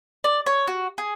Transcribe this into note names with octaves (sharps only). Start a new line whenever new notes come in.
D5
C#5
F#4
G#4